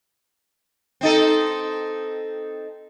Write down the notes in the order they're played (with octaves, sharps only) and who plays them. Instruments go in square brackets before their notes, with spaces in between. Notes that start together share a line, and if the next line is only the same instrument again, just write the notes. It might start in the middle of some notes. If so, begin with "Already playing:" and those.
[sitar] C4 D#4 A4